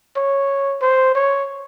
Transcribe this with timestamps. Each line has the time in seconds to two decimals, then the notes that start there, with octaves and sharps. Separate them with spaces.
0.17 C#5
0.82 C5
1.15 C#5